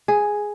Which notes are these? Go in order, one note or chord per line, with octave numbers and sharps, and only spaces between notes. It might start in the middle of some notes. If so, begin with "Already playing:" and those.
G#4